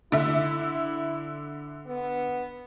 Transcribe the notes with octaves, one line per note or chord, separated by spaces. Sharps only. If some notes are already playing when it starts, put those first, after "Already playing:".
D3 E4 E5
B3